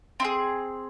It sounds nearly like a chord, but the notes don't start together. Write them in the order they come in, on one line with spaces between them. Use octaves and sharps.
C4 E4 G#4